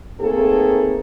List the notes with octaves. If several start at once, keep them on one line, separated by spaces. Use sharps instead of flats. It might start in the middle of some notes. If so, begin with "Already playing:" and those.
A3 A#3 C4 D#4 G#4 A4